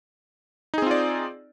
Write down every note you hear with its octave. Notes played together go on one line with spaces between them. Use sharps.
C4 D#4 F4 G#4 D5